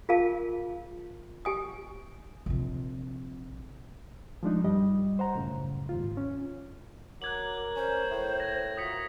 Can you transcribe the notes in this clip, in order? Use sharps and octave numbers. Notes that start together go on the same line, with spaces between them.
F4 G#4 A#4 F5 A5
G4 G#5 D#6
A#1 C3
F3 G#3 D4 D#4
G2 G3 G4 D#5
C5 F#5 A#5
C#2 F#2 A2 C#3
D#2 G#2 F4
C#4
F#3 A#4 D6 F#6 G#6 F#7
C#4 C5
A2
G#6 A#6
F4 F#4 A#4 D#6 B6 C#7